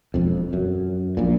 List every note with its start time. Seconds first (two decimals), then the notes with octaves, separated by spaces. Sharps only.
0.14 E1 F2
0.53 F#2
1.17 A#1 A#2